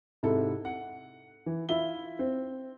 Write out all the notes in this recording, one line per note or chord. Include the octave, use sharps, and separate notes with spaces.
G#2 C3 E4 A4
F#5
E3
E4 F4 E5 G7
C4